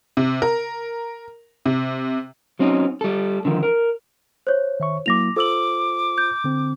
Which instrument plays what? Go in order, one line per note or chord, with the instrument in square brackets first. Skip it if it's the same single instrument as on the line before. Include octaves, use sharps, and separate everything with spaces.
[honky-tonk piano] C3
A#4
C3
[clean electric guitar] F#3 C4 C#4 D#4
G3 A4
D3 D#3 F3
A#4
[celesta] C5 C#5
[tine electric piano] D#3 E5 C#6
[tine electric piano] F#3 A#3 E4 [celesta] D6 A#6 F7
[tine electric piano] F4 C5 [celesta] A4 E6 F#7 [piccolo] D6
[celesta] G6
[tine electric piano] D3 C4